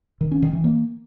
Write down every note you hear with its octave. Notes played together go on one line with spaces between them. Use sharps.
D#3
C#4
D#3
E3
A#3